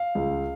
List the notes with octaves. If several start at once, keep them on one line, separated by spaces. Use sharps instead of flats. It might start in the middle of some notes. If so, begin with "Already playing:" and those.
Already playing: F5
C#2